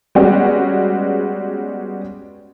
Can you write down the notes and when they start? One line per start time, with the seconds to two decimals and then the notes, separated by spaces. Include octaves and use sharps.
0.15 G3 G#3 B3 C#4 F#4